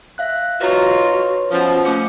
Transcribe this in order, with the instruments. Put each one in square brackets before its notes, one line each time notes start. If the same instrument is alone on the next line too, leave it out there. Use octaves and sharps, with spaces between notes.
[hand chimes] E5 F5 F#6
[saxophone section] D#4 F4 [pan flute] F#4 [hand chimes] B4 C#5 C6
[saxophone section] B2 F3 [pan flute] C#4
[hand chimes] A3 D6 C#7 [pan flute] C#4